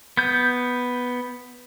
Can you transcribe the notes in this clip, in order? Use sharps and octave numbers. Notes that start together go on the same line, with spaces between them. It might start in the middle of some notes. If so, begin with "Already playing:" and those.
B3 G6